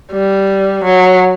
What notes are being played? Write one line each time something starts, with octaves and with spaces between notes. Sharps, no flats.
G3
F#3